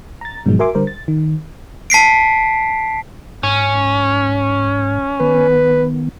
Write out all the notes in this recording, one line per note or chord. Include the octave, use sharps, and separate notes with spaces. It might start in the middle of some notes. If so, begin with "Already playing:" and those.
A#5 A6
G#2 B2 D#3 F3 F#3 G#3
F#4 A#4 E5 G#5 C6 D6
D3 G3 A#4 C5
A6
D#3
A5 B6 C7 D7
G#2 C#4
D#3 B3 B4